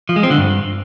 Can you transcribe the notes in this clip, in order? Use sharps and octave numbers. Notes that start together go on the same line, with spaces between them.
F3
G#3
C4
D3
G2